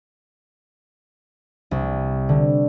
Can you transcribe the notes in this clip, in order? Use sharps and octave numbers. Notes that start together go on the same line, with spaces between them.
C2
D3